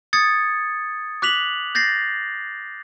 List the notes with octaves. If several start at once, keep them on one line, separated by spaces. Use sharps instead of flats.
D#6 G#6 A6 C#7
D6 F#6 B6 F7 F#7
G6 A6 A#6 C7